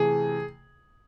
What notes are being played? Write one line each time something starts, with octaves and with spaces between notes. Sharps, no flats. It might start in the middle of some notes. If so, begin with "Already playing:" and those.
Already playing: C3 E3 A3 G#4